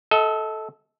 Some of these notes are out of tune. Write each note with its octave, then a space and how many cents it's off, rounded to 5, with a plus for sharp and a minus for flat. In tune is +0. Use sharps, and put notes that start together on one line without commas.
A4 -10 D#5 +40 F#5 +0